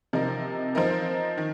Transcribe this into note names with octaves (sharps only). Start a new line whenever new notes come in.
C3 F3 D#4 A#4
F3 C4 D#4 A#4
D#3